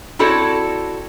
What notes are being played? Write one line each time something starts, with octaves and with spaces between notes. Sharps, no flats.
C4 E4 F#4 A4 C#5 D5